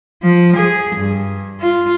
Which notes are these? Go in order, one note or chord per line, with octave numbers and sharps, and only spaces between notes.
F3
G#4
G2
F4